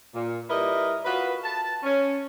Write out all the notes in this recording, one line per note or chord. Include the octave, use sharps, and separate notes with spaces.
A#2
G3 E4 A#4 B4 D#5
F4 F#4 B4
A5
C#4